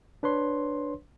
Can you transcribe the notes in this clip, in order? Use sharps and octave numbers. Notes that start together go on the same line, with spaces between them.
D4 B4 C#5 C6